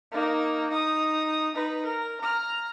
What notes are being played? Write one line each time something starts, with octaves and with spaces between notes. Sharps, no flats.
A#3 D#4
D#4 D#6
D#4 B4
A#4
A#5 F6